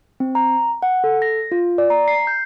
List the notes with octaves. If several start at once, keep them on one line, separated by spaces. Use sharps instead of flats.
C4
A#5
F#5
A4
A#6
F4
D5
A#5
C7
G6